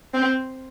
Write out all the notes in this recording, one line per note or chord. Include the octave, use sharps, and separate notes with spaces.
C4